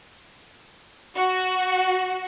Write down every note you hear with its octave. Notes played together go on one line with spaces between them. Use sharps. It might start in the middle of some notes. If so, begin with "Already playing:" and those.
F#4